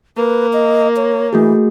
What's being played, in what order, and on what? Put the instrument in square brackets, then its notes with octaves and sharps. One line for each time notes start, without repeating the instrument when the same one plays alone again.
[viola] A#3 [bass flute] B4
[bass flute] D#5
C#5
[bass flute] E3 [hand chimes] A3 F#4 G#4